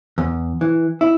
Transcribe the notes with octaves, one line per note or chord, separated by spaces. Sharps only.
E2
E3
E4